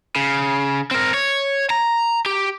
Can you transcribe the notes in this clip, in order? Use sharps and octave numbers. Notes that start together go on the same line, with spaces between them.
C#3
C4 A#4
C#5
A#5
G4